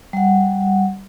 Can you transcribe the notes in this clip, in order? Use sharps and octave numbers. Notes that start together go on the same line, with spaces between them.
G3 F#5